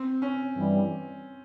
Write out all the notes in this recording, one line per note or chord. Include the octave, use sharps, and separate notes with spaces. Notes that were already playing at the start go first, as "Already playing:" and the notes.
Already playing: C4
C#4
G2 E3 G3